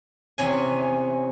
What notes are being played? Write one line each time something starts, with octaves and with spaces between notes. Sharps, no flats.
E2 C3 C#4 G#5